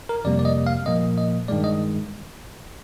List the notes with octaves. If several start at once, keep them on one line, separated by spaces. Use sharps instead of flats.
A#4
F2 C3 G3 A#3 D5
D5
D#5
F5
A#2 F3 A#3 D#5
D#5
G2 D#3 G#3 D5
D#5